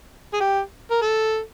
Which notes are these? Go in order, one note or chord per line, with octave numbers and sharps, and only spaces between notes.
G#4
G4
A#4
A4